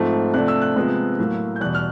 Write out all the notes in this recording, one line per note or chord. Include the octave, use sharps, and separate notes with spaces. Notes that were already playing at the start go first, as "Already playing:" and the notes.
Already playing: G#2 F3 A3 C4
C3 F3 A3 D4 F#6
E6
F#6
C3 F3 G#3 B3
A2 F#3 A#3
G6
E2 B2 G3 F#6
F6